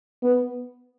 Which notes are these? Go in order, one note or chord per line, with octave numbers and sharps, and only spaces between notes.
B3